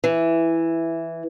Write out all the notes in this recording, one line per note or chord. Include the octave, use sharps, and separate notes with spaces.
E3